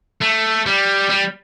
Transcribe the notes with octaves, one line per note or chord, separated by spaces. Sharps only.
A3
G3
G3